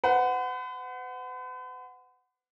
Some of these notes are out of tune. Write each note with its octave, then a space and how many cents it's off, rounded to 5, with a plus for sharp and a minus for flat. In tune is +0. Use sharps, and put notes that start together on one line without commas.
B4 +45 F#5 +0